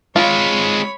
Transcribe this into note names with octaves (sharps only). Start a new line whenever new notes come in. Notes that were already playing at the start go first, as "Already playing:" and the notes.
G#3 C4 F4 C#5 B5